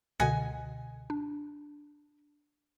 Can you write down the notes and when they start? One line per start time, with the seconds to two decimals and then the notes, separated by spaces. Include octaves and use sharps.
0.20 C#2 B2 D3 D#5 F#5 G#5
1.10 D4